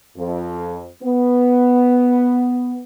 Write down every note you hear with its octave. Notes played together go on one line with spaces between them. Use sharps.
F2
B3